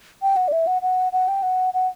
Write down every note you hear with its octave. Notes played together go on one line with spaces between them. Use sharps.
G5
F#5
D5
E5
F#5
F#5
F#5
G5
F#5
F#5